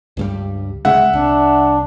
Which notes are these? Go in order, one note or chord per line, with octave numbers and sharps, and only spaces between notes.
C#2 G2 G3
D1 C#3 G#3 E5 F#5
C2 D4